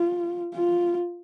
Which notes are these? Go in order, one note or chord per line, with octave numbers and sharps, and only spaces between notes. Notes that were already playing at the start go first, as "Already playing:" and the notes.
Already playing: F4
F4